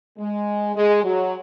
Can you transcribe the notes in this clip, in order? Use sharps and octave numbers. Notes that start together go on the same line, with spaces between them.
G#3
G#3
F#3